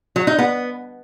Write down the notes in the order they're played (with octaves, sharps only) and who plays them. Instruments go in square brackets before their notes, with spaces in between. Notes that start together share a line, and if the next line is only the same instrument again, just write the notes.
[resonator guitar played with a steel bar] F#3
D#4
B3